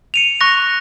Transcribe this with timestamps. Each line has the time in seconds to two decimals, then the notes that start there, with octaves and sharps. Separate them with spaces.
0.14 C#7 D#7 F7
0.41 C#6 F#6 A#6